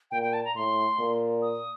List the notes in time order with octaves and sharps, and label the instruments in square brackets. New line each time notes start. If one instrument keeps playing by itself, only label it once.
[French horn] A#2 [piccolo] G5
[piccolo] G5
A5
A#5
[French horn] A2 [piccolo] C6
[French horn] A#2
[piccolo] D#6